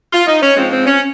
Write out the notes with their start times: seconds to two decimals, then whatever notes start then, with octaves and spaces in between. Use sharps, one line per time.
0.12 F4
0.27 D#4
0.42 C#4
0.56 G#2 F3 G#3 C4
0.71 C4
0.86 C#4